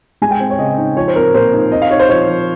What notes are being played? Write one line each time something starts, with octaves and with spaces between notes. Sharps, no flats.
G#3 G#5
G5
C4
C#5
C#3 D#5
D#4
F3 C#5
C5
C4 A#4
A#2 C5
D#4
C4 D#5
F5
D#4 C#5
C5
F3 C#5
F3